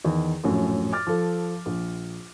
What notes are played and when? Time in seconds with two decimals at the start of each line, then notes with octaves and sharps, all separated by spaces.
0.05 E2 D#3
0.44 A#1 F#2 A2
0.92 D6 F6 A6
1.07 F3 A4
1.66 A#1